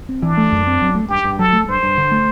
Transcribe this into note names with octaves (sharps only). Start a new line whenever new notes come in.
C4
E3 D4
A3
F#2
C4
F#3
A3
G2 G4
G2
F#3 A4
A3
G2 C5
G2
D3
A3